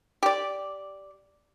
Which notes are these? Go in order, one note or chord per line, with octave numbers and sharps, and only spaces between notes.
G4 D5